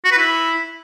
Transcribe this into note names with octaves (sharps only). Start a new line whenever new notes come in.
F#4
B4
E4